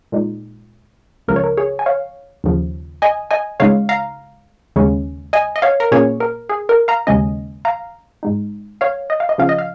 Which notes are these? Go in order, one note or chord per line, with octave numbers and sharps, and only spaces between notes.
A#2 G#3 D#4
C#2 C#3 F3 A#4
C#5
A#4
G#4 C#5
G#5
C#5 F5
D#2 C#3 F3
D#5 G#5
D#5 G#5
C#2 C#3 G#3 D#4 C#5 F5
F5 A#5
D#2 C#3 G#3 C#4
D#5 G#5
D#5
C#5 F5
A#4
A#2 A#3 C#4 G#4 C#5
A#4
G#4
A#4
F5 A#5
D#2 C#3 G#3 C#4 D#5 G#5
F5 A#5
G#2 G#3 D#4
C#5 F5
D#5
F5
D#5
C#3 F3 C#4 F5
D#5
F5